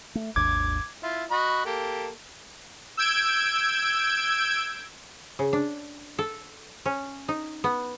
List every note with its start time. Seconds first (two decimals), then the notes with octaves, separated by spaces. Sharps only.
0.15 A3
0.36 G#1 D#2 D4 D6 G#6
1.03 E4 F4
1.31 F#4 D#5 B5
1.65 A#3 G4 A4
2.97 E6 G6 G#6 D7
5.39 C#3
5.53 D4
6.19 A4
6.86 C#4
7.28 D#4
7.64 B3